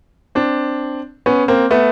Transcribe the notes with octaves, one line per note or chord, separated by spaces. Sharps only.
C4 D4
B3 C#4
A#3 C4
A3 B3